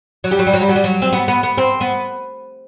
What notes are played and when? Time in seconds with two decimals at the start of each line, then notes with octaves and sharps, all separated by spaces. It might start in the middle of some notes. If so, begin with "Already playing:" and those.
0.24 F#3
0.31 G3
0.39 F#3
0.47 G3
0.53 F#3
0.62 G3
0.69 F#3
0.75 G3
0.84 F#3
1.02 C4
1.13 B3
1.28 B3
1.43 B3
1.58 C4
1.81 B3